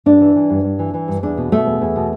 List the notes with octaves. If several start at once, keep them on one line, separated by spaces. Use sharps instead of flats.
G2 D4
E3
E3
G2
G2
E3
E3
G2
E2 D4
B2
B2 A3
E2
E2
B2